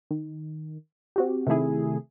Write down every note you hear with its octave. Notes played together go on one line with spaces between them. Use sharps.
D#3
C4 F#4 G4
C3 D#3 A3 E4 G#4